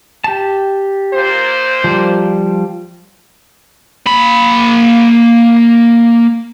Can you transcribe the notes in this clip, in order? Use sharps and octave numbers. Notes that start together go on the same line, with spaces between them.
G4 A5
A#2 C5
F3 G3
A#3 B5